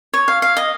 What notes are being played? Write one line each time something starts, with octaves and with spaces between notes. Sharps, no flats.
C#5
F5
F5
D#5